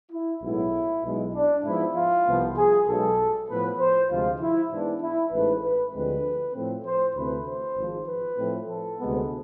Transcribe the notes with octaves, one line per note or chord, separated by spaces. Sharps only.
E4
B1 A2 G#3 B3 E4
B1 B2 G#3
D4
G#2 F3 B3 E4
F4
C2 C3 F3 B3
G#4
B1 B2 G#3 A4
A2 F3 B3 B4
C5
D2 C3 F3 G#3 F4
E4
G#2 E3 B3 D4
E4
A1 G#2 E3 A3 B4
B4
D2 D3 F3 G#3 C4 B4
A2 F3 A3 C4
C5
D2 C3 E3 A3 C4 B4
C5
G#1 G#2 F3
B4
A2 F3 A3 C4
A4
D2 C3 G#3 B3